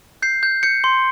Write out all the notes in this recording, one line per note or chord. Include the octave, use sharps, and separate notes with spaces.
G6 C7
G6
G6 C#7
C6